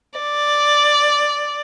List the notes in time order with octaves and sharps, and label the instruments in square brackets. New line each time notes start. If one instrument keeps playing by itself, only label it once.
[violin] D5